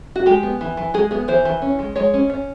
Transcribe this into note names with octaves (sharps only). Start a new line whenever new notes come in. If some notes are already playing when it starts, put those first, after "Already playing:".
F#4
G#3 G4
B3
E3
E3
G#3 G#4
B3 G#4
E3 C5
E3
C#4
G#3
G#3 C#5
C#4
C#4